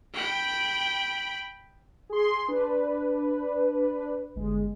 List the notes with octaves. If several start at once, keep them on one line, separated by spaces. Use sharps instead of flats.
G5 B5
G#4 C6
D4 B4
G1 G#3